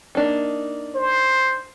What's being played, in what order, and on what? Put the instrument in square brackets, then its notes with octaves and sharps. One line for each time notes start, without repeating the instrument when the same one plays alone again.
[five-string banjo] A#3 D4 D#4
[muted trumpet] C5